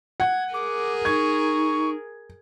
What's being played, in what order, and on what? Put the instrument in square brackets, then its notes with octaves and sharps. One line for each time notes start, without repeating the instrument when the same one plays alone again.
[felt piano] F#5 [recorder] G#6
[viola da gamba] G#4 A#4 [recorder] D6
[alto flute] D#4 [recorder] C#6 [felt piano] G#6